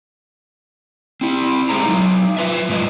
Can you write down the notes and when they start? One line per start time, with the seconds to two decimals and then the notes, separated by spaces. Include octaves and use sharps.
1.21 C4 E4
1.69 G#3 C4 G#4 C5 A#5
1.86 F#3 D#4
2.37 F4 B4 E5
2.69 G#2 G#3 B4 D#5